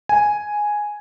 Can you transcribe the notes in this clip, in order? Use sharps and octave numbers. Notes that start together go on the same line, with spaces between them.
G#5